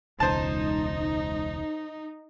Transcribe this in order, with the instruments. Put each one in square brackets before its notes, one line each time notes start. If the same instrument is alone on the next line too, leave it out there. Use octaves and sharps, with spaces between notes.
[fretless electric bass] E1 C#2 [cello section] D#4 [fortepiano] C5 A5